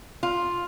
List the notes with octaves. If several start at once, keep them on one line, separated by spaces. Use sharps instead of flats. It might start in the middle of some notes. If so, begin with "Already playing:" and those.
F4